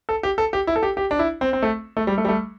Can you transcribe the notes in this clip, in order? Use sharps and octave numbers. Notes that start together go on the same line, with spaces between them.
A4
G4
A4
G4
E4
A4
G4
G4
D4
E4
C4
C4
A3
A3
G3
A3
G3
A3